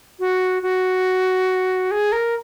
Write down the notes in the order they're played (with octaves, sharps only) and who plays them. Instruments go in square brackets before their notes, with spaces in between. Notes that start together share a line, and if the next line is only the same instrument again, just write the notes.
[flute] F#4
F#4
G#4
A#4